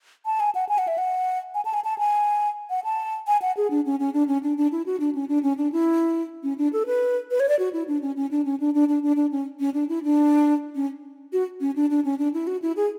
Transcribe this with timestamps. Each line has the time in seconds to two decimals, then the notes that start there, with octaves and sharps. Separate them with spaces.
0.26 A5
0.40 G#5
0.55 F#5
0.69 G#5
0.78 F#5
0.88 E5
0.98 F#5
1.54 G#5
1.65 A5
1.74 G#5
1.84 A5
1.98 G#5
2.70 F#5
2.84 A5
3.27 G#5
3.42 F#5
3.57 G#4
3.70 D4
3.86 C#4
4.00 C#4
4.13 D4
4.28 C#4
4.43 D4
4.57 D4
4.72 E4
4.86 F#4
5.00 D4
5.15 C#4
5.29 D4
5.43 C#4
5.58 D4
5.72 E4
6.43 C#4
6.58 D4
6.73 A4
6.86 B4
7.31 B4
7.40 C#5
7.49 D5
7.59 F#4
7.73 E4
7.88 D4
8.02 C#4
8.16 C#4
8.31 D4
8.45 C#4
8.60 D4
8.74 D4
8.89 D4
9.03 D4
9.16 D4
9.31 C#4
9.60 C#4
9.74 D4
9.89 E4
10.04 D4
10.75 C#4
11.33 F#4
11.61 C#4
11.76 D4
11.90 D4
12.05 C#4
12.19 D4
12.34 E4
12.47 F#4
12.62 E4
12.77 G#4